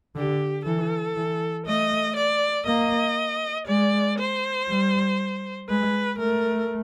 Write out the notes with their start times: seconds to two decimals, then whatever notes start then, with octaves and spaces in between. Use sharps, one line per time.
0.15 D3 G4
0.66 E3 A4
1.16 E3
1.66 A3 D#5
2.16 D5
2.67 A#3 D#5
3.67 G#3 D5
4.18 C5
4.68 G3
5.69 G#3 B4
6.19 A3 A#4